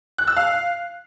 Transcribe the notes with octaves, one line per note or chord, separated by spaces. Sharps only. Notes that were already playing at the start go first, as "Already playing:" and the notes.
F#6
E6
F5